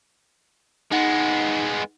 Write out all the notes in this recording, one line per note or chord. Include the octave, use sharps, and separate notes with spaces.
G#3 B3 D#4 F#5